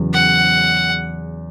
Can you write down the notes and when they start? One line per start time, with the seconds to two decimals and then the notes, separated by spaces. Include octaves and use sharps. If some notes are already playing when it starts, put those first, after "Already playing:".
Already playing: E2 C#3 F#3
0.14 F#5